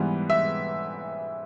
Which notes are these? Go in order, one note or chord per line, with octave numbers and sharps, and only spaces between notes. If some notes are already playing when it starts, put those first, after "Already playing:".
Already playing: G#2 E3 G3 B3
E5